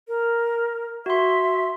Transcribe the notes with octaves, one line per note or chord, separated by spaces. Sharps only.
A#4
F#4 E5 C6